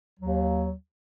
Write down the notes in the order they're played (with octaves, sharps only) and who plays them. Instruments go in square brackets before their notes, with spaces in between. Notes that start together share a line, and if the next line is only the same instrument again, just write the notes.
[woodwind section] D#2 F#3